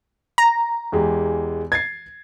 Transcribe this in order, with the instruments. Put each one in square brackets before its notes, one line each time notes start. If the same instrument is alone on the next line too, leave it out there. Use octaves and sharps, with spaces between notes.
[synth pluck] A#5
[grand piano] E2 G#3 G4
G#6 A6 C7